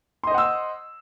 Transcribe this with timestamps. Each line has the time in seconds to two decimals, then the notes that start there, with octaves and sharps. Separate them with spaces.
0.24 C6
0.27 D#5
0.31 C5
0.34 F#5
0.38 E6